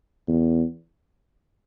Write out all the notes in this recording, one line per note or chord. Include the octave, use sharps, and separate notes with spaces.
E2